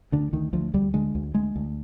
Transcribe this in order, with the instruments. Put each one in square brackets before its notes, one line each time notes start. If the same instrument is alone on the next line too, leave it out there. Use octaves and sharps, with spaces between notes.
[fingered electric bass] D2 D3
D2 D#3
D2 F3
D2 G3
D3 G#3
D2
D2 G#3
D2